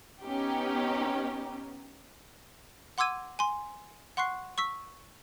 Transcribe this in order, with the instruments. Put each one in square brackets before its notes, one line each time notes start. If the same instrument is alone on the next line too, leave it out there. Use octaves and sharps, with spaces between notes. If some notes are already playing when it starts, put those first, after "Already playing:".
[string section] B3 C#4 D#4 G4
[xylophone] F#5 C6 D6 E6 G#6 D#7
G#5 C6
F#5 C6 C#6 F#6 C7
C#6 E6 B6